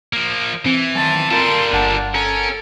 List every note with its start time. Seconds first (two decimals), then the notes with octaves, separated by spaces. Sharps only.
0.13 F3 A#3
0.66 E3 C4
0.95 F#2 D#3 A5 C6
1.31 G3 F4 A4 A#4 C6
1.73 G1 D4 F#5 A5
2.15 C#4 A4 A#4